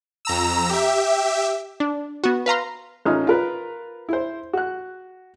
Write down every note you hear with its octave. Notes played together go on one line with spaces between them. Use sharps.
F2 A#5 E6
G4 E5
D4
B3 F#4
B4 F5 A#5 C6
A1 C#4 D#4 F4 D#6 F6
F4 A#4 B4
E4 C5
F#4 F#6